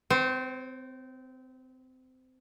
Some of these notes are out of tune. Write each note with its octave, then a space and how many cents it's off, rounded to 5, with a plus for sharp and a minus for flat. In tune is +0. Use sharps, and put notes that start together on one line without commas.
C4 -25 C5 +40